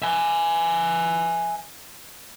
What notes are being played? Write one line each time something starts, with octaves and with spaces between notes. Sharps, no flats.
E5 G#5